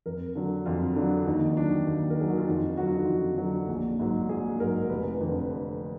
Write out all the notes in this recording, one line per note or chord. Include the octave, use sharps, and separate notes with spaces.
F2 A#4
D3 F#3
F2 F4
D3 F#3 D4
D#2 D#4
D#3 F#3 D4
D#2
A#4
D#3 F#3 G#4
F#4
F4
F2 D#4
D3 F#3 F#4
F4
D#4
F2 F4
D3 F#3
A#1
G#2 F#3
A#1 G#4
G#2 F#3 A#4
F1 B4
F2 D3 F3